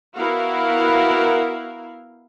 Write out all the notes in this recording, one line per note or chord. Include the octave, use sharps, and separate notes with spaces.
B3 E4 F#4 A#4 F5